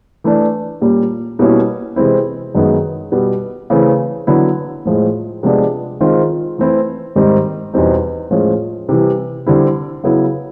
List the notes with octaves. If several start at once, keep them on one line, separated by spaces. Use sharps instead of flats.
E3 A3 D4
A#2 G3 A#3 C#4
B2 G3 A#3 C#4 E4
C3 E3 G#3 C4 E4
F#2 D#3 G#3 B3
B2 G3 B3
C#3 E3 A3 C4 E4
D3 F#3 B3 E4
A2 F3 G#3
C3 F3 G#3 B3 D4
D#3 G#3 C4 F4
E3 A3 C4 E4
G#2 D#3 G3 C4 D#4
E2 B2 G3 C4 D#4
A2 F3 G#3 C#4
C3 E3 G3
D3 G3 C4 E4
C#3 F#3 B3 E4